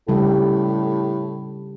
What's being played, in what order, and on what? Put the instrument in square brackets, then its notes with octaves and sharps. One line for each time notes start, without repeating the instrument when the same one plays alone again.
[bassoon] A2 [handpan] C#3 G3 G4